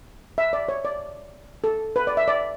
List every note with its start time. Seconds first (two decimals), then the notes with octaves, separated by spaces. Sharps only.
0.38 E5
0.53 D5
0.69 C#5
0.85 D5
1.64 A4
1.96 B4
2.07 D5
2.17 E5
2.28 D5